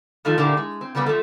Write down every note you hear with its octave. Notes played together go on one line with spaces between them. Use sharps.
D#3 F3 A3 D#4 F4
A#2 D3 A3 A#3 E4 G4
G#3
C4
C#3 G3 A#3 B3
F3 A3